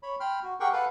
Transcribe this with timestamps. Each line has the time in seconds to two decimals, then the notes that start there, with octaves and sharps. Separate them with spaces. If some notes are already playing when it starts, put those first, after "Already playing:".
0.03 C#5 B5
0.20 G5 B5 C6 F6
0.43 F#4
0.60 G4 G#4 A#4 F#5 G5 C#6
0.73 A4 B4 F5 F#5